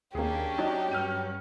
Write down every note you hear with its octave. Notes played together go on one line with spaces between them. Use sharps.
D#2 A#3 C#4 D4 G4 G#4
F#3 D#4 D5
G2 C#4 F6 G6 D#7